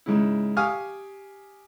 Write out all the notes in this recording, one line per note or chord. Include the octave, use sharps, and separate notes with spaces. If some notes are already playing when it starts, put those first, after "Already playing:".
G#2 C#3 E4
G4 F5 G#5 C#6 D#6 F6